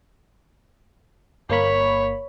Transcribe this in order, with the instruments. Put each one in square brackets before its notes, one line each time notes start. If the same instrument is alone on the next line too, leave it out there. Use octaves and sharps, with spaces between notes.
[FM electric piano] G1 A#3 B5 [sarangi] C#5